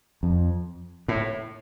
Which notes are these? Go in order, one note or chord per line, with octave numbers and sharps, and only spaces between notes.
F2
A2